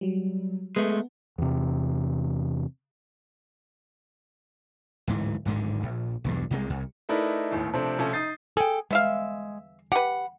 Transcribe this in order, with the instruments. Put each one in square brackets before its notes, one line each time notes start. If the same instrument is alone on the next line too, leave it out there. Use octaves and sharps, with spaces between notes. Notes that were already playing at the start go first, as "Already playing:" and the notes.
[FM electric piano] F#3 G3
[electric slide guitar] G#3 A3 [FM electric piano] B3
[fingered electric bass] E2 C3
[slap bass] D1 G#2 E3
D1 G#1 G#2 D3
A#1
B1 E2 G2
C2 C3 F3 G#3
C2
[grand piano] A3 D#4 E4 A#4 B4 D5
G1 D#2 A2
C3 F3 A3 C4 D4
C3 F3 A3 C#4
D#4 D#6 G6 A6 C7
[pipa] G#4 [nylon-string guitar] A4 G5
[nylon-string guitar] G#3 [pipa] B3 E5 F5
[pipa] G4 B4 [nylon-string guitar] F#5